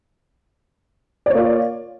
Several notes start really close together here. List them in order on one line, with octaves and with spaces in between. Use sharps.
D5 C#5 A#3 F4